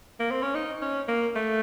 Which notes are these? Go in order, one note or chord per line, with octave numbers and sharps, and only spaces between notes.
A#3
C4
C#4
D#4
C#4
A#3
A3